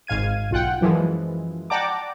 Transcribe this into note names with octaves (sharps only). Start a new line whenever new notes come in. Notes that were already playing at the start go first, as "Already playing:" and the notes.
G#1 G#2 F5 G#6 D#7
B1 F4 F#5 G5
F#2 E3 F3 G#3
D5 F#5 G5 A5 A#5 D6